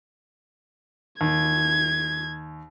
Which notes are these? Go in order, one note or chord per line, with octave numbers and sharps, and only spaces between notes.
D#2 G#6